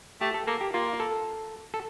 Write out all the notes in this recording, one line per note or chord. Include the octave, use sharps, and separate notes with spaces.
A3 G4
A4
A#3 A4
G4
A#3 F4
A4
A4